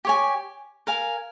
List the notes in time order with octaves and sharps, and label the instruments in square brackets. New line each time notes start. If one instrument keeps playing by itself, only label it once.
[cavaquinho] G4 C#5 G#5
A#4 F5 G#5